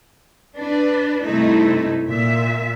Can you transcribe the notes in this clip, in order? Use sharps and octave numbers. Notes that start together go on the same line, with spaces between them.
D4 B4
G2 C3 A3 D#4 E4
A#2 E5